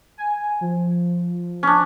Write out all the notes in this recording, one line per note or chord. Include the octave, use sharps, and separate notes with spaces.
G#5
F3
C#4 D4